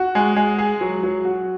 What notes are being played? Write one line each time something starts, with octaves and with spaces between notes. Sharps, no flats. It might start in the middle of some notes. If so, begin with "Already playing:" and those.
Already playing: F#4
G#3
G#3
G#4
F#3
F#3
F#4